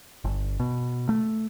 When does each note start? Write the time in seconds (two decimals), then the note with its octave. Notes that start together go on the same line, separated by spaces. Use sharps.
0.24 G1
0.60 B2
1.09 A3